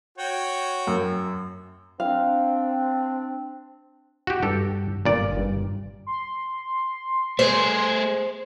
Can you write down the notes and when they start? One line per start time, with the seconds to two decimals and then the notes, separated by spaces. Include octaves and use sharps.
0.18 F#4 C#5 G5
0.87 F#2
2.00 C4 D4 F5
4.27 F#4 G4
4.43 G2 G4 A4
5.05 G1 A#2 D5
5.37 G2
6.07 C6
7.39 A3 G#4 C5